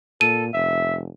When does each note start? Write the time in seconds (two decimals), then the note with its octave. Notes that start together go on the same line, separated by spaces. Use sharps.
0.21 A#2 A4 D#7
0.54 F1 E5